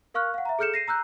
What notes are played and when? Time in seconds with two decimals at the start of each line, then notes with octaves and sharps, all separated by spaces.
0.14 A#4 F5 C#6 F6 F#6
0.34 F5 F#5
0.45 E5 A#5
0.59 G#4 A4 F6 G6 C#7 E7
0.74 A#6 C7 D#7
0.88 A#5 E6 F#6 G6